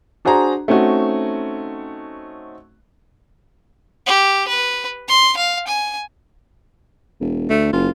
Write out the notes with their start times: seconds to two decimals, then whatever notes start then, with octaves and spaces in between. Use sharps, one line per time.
0.25 D4 F#4 G#4 C5 A#5
0.68 A3 C4 C#4 D#4 F#4
4.06 G4
4.48 B4
5.08 C6
5.37 F5
5.67 G#5
7.20 E1
7.50 D2 A3
7.73 F#1 F4